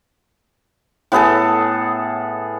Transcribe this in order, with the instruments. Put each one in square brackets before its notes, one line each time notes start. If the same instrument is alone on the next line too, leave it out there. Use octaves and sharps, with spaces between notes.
[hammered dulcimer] A2 B3 G#4 A4